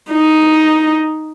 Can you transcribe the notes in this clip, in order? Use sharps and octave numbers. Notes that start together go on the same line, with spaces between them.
D#4